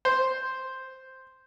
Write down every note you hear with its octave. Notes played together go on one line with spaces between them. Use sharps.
C5